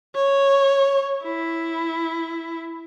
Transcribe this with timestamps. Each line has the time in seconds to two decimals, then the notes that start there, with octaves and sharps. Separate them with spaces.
0.15 C#5
1.23 E4